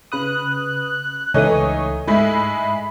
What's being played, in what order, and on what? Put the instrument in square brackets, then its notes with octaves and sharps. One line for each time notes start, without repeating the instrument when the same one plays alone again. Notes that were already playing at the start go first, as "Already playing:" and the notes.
[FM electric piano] C#3 B4 D#6 [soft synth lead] F#6
[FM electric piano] C#2 A3 D#6 [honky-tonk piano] E3 D#4 [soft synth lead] C#5
[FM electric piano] G#2 [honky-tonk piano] G#3 A3 E4 [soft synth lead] B5